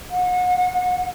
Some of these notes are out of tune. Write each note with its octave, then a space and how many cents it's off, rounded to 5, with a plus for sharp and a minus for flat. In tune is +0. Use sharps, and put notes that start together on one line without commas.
F#5 -35